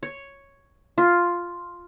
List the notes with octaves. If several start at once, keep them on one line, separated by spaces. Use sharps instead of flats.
C#5
F4